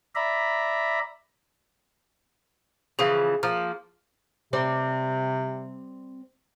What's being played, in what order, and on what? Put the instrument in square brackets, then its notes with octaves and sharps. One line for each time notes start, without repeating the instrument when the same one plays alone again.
[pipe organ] D5 E5 A#5 B5
[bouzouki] C#3 E3 F3 [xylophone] G#4 F5
[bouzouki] F3 A#3 [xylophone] F6
[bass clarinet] C3 [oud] G3 C4 D5